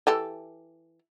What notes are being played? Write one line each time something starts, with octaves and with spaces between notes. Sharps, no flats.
E3 G4 A4